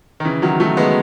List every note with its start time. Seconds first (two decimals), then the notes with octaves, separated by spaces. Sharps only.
0.20 D#3
0.25 C#3 E3
0.42 D#3 F#3
0.60 F#3 A3
0.77 G#3 B3